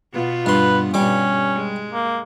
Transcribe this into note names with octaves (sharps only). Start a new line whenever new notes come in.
B2 B3 F4
G2 B4 C6
G2 B2 G3 C#4 D6
G#3
A#3